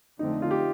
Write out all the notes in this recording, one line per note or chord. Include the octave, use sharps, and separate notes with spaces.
F2 D3 A3 C4 D#4
F4
G4